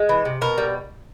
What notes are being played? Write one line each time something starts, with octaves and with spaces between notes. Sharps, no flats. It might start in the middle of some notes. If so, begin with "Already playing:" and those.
Already playing: G#3
E3
C3
B2 A#4
G3